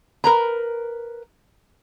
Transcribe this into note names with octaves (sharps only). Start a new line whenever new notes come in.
A#4 B4 A#5